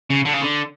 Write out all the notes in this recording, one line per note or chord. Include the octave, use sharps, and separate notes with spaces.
C#3
D3
C#3
D3